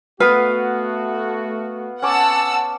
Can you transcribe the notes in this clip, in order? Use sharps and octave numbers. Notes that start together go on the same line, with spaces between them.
A3 B3 F#4 B4 F5
C#4 F#5 A5 D6 E6